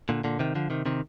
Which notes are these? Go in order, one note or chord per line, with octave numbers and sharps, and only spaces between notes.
A#2 D3
A#2 D3
C3 D#3
D3 F3
C3 D#3
C3 D#3